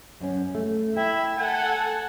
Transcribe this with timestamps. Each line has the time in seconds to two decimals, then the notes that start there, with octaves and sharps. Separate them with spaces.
0.20 F#2 C#4
0.55 A3
0.97 E4 E5 G5
1.38 A4 F#5 G#5